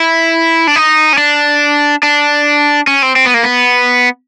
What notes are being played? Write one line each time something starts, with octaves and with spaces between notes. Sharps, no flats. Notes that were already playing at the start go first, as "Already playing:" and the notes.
Already playing: E4
D4
D#4
C#4
D4
D4
C#4
C4
C4
B3
A#3
B3